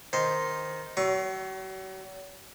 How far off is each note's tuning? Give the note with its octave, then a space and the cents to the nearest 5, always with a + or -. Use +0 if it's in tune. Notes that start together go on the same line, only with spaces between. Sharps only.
D#3 +0 C5 +0
F#3 +40 C#6 +0